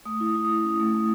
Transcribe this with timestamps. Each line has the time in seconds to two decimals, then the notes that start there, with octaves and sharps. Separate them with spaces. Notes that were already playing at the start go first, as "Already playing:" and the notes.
0.05 A3 D#6
0.20 E4
0.26 D#6
0.36 E4
0.45 D#6
0.50 E4
0.65 C#4
0.80 A3
0.94 A3